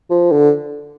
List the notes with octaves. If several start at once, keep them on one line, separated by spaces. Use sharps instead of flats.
F3
D3